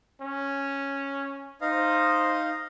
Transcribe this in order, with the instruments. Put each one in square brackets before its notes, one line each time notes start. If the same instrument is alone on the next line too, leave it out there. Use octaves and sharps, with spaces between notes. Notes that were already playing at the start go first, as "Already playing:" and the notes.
[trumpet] C#4
[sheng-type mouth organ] D#4 D#5 F5 [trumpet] C5